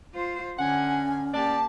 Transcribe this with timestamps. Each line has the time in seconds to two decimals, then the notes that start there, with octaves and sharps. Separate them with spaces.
0.14 F4 C5
0.58 D3 C#4 F#5 G#5
1.34 A#3 G4 D5 A5